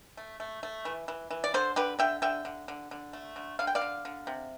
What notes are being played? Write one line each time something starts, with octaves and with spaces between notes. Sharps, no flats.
A3
A3
A3
E3
E3
E3
D5
D3 A4 C5
D3 G4 B4
D3 E5 G5
D3 E5 G5
D3
D3
D3
A3
D3
D3 F5
G5
D5 F5
D3
D3
C3